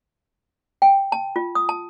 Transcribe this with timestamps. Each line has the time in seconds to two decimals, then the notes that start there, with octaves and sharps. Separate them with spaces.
0.82 G5
1.12 A5
1.36 F4
1.55 D#6
1.69 A5